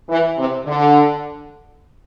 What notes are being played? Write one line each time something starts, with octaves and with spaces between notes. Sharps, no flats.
E3
C3
D3